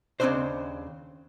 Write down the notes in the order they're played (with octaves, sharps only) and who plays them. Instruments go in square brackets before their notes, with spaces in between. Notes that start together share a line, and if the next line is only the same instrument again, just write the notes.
[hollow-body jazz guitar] D#2 C#3 A3 C4 D4 C5